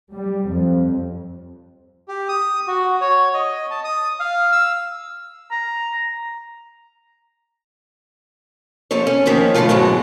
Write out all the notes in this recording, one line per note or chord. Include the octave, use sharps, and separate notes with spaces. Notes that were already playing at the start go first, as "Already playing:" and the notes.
G3
F2
G4
D#6
F#4
C#5
D#5
A5
D#6
F5
E6
A#5
F3 A#3 A4 C#5
C#4
D#3 F3 A#3 C#4
D2 A2 E3 F3 A3 F4
G#2 B2 E3 F#3 G#3